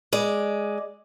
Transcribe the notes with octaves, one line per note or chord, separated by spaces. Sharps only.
G#3 D5